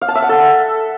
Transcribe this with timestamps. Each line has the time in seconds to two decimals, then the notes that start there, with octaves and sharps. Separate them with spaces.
0.01 F5
0.08 A5
0.15 E5
0.22 F#5
0.29 A4